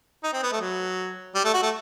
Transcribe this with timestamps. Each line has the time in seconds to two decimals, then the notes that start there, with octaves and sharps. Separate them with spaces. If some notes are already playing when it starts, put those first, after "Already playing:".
0.24 D#4
0.33 C4
0.43 B3
0.52 A3
0.61 F#3
1.35 G3
1.45 A3
1.54 F#4
1.63 A3